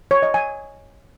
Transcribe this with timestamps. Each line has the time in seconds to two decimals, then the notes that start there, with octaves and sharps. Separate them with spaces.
0.11 C#5
0.23 D#5
0.34 G#5